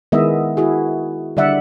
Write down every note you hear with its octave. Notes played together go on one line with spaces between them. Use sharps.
D#3 G#3 B3 E4 D#5 E5
E4 F#4 G#4
D3 G3 D5 E5 F#5